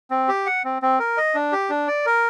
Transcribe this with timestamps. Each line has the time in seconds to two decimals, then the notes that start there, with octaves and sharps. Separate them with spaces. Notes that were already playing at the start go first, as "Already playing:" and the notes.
0.11 C4
0.29 G4
0.46 F#5
0.65 C4
0.82 C4
1.00 A#4
1.17 D#5
1.35 D4
1.52 G4
1.70 D4
1.87 D5
2.06 A#4